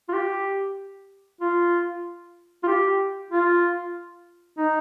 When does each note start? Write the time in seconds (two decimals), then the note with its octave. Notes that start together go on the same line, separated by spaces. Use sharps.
0.09 F4
0.13 G4
1.41 F4
2.63 F4
2.68 G4
3.31 F4
4.58 D#4